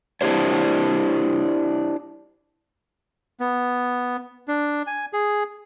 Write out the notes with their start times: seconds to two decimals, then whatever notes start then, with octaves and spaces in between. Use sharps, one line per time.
0.21 D4 E4 G4 C5 C#5
3.40 B3
4.48 D4
4.87 G#5
5.13 G#4